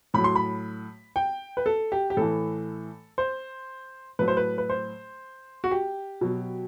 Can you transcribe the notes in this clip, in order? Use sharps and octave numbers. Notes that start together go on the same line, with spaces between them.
A2 F#3 B5
C6
B5
G5
B4
A4
G4
G4
A2 E3 A4
C5
A2 F#3 B4
C5
B4
B4
C5
F#4
G4
B2 F#3